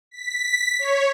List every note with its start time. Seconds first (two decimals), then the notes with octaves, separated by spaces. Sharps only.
0.11 B6
0.79 C#5